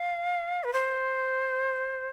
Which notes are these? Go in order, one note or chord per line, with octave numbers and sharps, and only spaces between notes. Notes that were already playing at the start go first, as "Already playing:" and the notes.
Already playing: F5
B4
C5